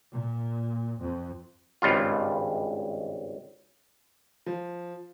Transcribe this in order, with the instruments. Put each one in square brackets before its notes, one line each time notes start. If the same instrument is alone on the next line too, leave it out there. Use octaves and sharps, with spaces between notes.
[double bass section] A#2
F2
[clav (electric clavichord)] G#1 C#2 G2 F4
[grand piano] F3